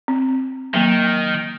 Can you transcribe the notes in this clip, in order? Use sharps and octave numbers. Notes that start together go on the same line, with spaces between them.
C4
D#3 F#3 A#3